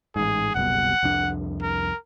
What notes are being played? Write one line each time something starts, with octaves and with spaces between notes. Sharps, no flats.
A1 G#2 G#4
F#1 C2 B2 F#5
C2 F2 D4
A#4